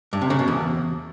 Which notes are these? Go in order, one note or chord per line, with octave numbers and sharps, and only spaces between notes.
G2
C3
C#3
B2
E2